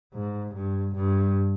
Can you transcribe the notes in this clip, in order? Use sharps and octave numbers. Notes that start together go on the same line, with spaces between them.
G#2
G2
G2